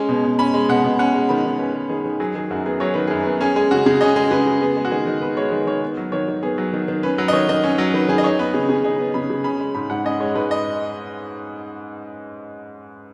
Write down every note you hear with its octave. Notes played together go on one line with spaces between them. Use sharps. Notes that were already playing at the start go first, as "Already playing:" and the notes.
Already playing: G#3 C#4
B2
B2
C#4 B5
G#3
B2 F#5
B2
C#4 F#5
G#3
D#3 B5
D#3
C#4 B4
G#3
D#3 G#4
D#3
F#3 G#4
D#3 G#4
F#2 F#4
B3 G#4
F#3 C#5
D#3 B4
F#2 G#4
B3 B4
C#4 G#4
G#3 G#4
C#3 F#4
C#3 G#4
C#4 D#5
G#3 G#4
C#3 B4
C#3
B3 G#4
G#3
F#4
D#3 G#4
D#3
B3 B4
G#3 C#5
D#3 B4
D#3 C#5
B3
F#3
D#3 C#5
D#3
B3 G#4
F#3
D#3
D#3
C#4 B4
F#3
D#5
D#3 C#5
D#3 D#5
C#4
F#3
D#3 B4
D#3 G#4
D#5
D#4 C#5
B3 B4
C#3 G#4
C#3 G#4
D#4 G#4
B3
C#3 B5
C#3
C#4 B5
G#3
G#2 B5
G#2 F#5
C#4 D#5
G#3 C#5
G#2 B4
D#5